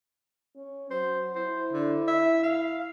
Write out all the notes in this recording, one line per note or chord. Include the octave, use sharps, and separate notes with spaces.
C#4
F#3 C5
E4 C5
D3
E5
F5